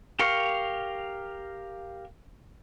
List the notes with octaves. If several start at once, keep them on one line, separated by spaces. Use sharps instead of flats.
G4 A#4 F5 C#6